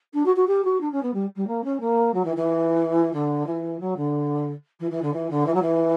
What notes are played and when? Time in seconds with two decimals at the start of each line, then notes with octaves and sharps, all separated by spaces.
0.13 D4
0.25 F#4
0.36 F#4
0.47 G4
0.64 F#4
0.80 D4
0.91 C#4
1.02 B3
1.13 G3
1.36 G3
1.47 A#3
1.64 C#4
1.80 A#3
2.13 F#3
2.24 E3
2.36 E3
3.13 D3
3.46 E3
3.79 F#3
3.96 D3
4.79 E3
4.90 E3
5.02 D3
5.13 E3
5.30 D3
5.46 E3
5.54 F#3
5.62 E3